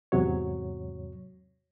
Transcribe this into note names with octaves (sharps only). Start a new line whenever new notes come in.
E2 G#2 C3 F#3 C#5